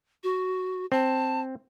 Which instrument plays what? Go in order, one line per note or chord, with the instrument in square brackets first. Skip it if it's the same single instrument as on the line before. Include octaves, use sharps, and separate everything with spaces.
[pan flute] F#4
[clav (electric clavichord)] C4 [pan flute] A5